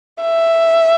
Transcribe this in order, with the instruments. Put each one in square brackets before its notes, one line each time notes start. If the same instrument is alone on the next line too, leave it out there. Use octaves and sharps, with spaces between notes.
[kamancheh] E5